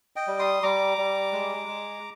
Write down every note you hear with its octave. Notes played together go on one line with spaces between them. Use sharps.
D#5 G5
G3
C6 D#6
G3 A#5 D6
G3
G#3
G#3